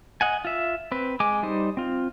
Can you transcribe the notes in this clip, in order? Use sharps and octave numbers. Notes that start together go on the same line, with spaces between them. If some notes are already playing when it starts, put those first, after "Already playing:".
D#5 F#5 G#5
F4 E5
C4 B4
G#3 G#5 D6
G3 D#4 C5
C4 F4